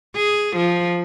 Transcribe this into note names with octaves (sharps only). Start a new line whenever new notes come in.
G#4
F3